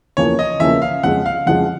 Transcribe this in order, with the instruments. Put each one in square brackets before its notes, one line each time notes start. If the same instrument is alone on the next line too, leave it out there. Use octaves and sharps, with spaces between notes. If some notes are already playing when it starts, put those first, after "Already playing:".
[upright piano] E2 C#3 F3 A#3 C#4 [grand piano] C#5
[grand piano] D#5
[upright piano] E2 C#3 F3 A#3 C#4 [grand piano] E5
[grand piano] F5
[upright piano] F2 C#3 F3 G#3 [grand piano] F#5
[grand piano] F5
[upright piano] F2 C#3 F3 G#3 [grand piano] F#5